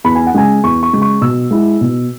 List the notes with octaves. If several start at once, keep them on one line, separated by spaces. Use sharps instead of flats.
E2 B5
G#5
F#5
C#3 G#3 G#5
E2 C#6
C#6
C#3 G#3
C#6
B2 E6
G#3 E4
B2